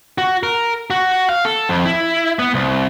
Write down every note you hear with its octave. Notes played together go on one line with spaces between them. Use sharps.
F#4
A#4
F#4
F5
A4
F2
E4
B3
C2